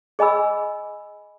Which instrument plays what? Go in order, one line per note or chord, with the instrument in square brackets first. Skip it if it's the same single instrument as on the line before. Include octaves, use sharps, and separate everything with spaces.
[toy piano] G#4 D#5 G#5 B5 E6